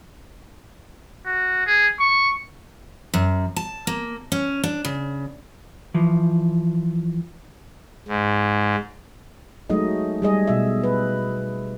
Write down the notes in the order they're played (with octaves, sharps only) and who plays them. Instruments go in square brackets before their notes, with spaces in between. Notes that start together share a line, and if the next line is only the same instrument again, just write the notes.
[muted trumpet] F#4
G#4
C#6
[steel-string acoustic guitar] F#2
A5
A#3
C#4
D4
C#3
[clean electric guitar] E3 F3
[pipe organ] G#2
[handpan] F#3 G#3 A3 D#4 D#5
G3 G#4 D#5
B2 E5
B4